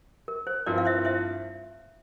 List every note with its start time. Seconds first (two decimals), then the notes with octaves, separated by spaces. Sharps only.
0.28 A#4
0.47 C5
0.66 G2 F3 C4 E4 A#4 D5
0.78 F5
0.85 C5 E5
1.05 C5 E5